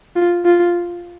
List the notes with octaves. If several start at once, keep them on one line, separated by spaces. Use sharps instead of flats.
F4
F4